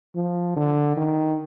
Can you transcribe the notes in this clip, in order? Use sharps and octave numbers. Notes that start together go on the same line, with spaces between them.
F3
D3
D#3